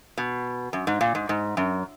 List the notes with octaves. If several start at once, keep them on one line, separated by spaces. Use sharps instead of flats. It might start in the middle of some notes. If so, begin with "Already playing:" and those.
B2
F#2
G#2
A#2
G#2
G#2
F#2